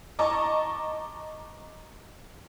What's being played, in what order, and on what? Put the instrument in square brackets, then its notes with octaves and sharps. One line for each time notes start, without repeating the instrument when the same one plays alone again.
[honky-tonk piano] D#5 A5 A#5 C#6 D6